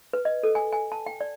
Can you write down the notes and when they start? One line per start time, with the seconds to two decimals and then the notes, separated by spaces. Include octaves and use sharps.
0.13 B4
0.25 D#5
0.43 A4
0.55 G#5
0.72 G#5
0.92 A5
1.06 G5
1.21 D5